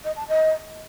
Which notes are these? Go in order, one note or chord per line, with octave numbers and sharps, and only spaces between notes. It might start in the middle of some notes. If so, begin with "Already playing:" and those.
D#5
A5
D#5